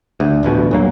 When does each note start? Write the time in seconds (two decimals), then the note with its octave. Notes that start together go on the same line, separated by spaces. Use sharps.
0.20 D2
0.43 D#1 A1 D2 B2
0.71 G2 F#3 A#3